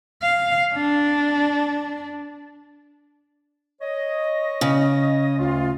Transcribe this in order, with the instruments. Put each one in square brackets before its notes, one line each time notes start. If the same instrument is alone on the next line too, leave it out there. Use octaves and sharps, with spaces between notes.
[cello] F5
D4
[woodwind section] C#5 D#5
[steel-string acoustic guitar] C#3
[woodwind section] D2 F4